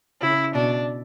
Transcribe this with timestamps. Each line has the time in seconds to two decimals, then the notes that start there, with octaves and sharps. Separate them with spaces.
0.22 C#3 E4
0.55 B2 D4